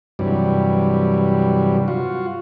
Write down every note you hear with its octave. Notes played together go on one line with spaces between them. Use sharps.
G2 C3 E3 F#3 G3
F4 F#4